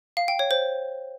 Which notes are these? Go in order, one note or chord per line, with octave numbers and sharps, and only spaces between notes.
F5
G5
C#5
C5